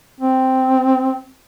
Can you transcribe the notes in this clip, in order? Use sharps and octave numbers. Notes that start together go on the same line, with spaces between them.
C4